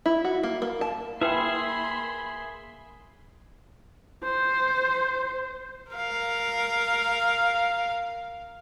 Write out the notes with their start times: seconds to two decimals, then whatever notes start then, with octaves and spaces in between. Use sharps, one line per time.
0.06 E4
0.25 F#4
0.43 A#3
0.62 A#3
0.81 A5
1.22 A#3 E4 G#4 B4 E5 G5 B5 C6
4.23 C5
5.92 A#4 F5